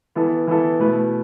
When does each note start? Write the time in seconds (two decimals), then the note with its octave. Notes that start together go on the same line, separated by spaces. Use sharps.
0.15 E3 B3 E4 A4
0.47 E3 B3 E4 A4
0.80 B2 A3 E4 B4